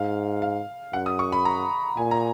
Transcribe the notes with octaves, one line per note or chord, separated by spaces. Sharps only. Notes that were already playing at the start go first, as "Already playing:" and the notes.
Already playing: G#2 F5
F5
F#2 F#5
D#6
C#6
B5
A#5
A#2 G#5
A#5